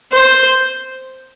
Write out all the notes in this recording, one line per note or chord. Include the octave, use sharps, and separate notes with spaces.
C5